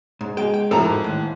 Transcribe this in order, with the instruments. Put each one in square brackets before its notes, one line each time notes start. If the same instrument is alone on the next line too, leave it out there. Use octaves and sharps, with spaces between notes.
[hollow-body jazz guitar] G#2
[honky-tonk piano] G#3 [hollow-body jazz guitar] G5
[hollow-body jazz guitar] G5
[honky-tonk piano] F2 A2 [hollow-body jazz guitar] A4 A#4 A#5
[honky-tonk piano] G#2
[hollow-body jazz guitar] D#2 A2